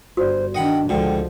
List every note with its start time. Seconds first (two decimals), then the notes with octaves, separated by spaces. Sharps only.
0.17 G1 F#4 C5 D5
0.55 D#3 D4 D#5 F#5 G5 B5
0.89 C#2 G#2 D3 F3 F#4 D5 G5